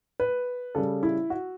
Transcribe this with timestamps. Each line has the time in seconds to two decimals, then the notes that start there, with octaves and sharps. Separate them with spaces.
0.20 B4
0.75 C#3 G3 A4
1.03 E4
1.30 F#4